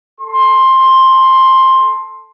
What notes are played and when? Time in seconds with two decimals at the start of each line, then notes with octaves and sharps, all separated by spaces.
0.20 A4 C6